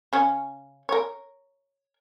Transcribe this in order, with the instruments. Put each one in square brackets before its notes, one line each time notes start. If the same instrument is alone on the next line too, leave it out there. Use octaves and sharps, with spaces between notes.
[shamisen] C#3 C#4
A#4 C#5